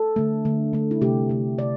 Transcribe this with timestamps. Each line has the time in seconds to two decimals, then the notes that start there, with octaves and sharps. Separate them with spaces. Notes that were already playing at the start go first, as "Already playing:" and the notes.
Already playing: A4
0.16 D3 A3
0.45 D3 A3
0.73 D3 A3
0.91 E4
1.01 C3 A3 G4
1.29 C3 A3
1.58 C3 D5